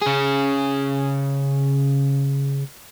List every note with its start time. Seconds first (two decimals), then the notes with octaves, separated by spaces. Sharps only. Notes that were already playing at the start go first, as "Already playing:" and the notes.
0.02 C#3 G#4